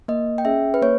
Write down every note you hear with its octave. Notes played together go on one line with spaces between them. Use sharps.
A#3 D#5
G5
C#4 G#4 E5
B4
A#3 C#5